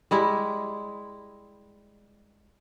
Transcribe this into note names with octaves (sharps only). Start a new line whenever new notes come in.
G3 G#3 E4